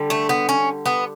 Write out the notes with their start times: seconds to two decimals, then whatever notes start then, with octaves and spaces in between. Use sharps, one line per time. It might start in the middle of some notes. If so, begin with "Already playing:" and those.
Already playing: D3 G3
0.10 A3
0.29 B3
0.49 C#4
0.86 B3